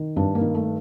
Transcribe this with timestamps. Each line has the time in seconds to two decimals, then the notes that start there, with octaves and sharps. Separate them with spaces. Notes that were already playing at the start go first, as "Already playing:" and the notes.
Already playing: D#3
0.16 G2 D4
0.35 A#3
0.41 D#3
0.54 A3